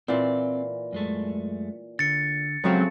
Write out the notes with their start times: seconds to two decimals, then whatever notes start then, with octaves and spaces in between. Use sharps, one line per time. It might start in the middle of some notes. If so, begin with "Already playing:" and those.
0.08 A#2 E3 C4 D5
0.93 F#2 G#3 A3
1.99 D3 A6 C#7
2.64 C#3 F3 F#3 G#3 A3 C4 E5